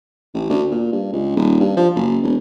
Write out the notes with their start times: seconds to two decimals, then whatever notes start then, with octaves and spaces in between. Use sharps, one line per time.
0.34 A1
0.50 D2
0.71 A#2
0.92 G2
1.12 C#2
1.37 D#1
1.60 G2
1.77 F3
1.95 F#1
2.23 E1